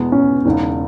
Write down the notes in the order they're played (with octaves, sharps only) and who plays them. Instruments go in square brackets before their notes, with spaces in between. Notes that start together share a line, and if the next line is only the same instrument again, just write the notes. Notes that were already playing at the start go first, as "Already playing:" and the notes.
Already playing: [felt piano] E2 B2 G#3 B3
[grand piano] C#4
[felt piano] E1 E2 C#3 [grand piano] D#4